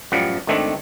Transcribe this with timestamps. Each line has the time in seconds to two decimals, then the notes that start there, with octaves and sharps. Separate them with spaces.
0.12 A1 F#2 F3 G3 F#5
0.47 G#1 D#3 A3 C4 D4 E5